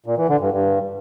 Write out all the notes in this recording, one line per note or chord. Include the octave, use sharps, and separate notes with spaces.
A#2
E3
D3
G2
G2